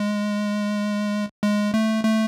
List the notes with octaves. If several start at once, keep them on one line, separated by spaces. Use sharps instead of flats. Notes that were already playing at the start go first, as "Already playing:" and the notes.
Already playing: G#3
G#3
A3
A3